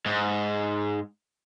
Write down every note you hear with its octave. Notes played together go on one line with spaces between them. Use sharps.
G#2